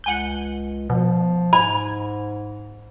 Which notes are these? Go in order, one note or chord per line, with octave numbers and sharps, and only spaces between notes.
C#2 F#5 G#5 G6
B2 F3
G#2 G#5 B5